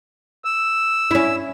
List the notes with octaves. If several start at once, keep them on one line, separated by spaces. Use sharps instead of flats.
E6
C#4 E4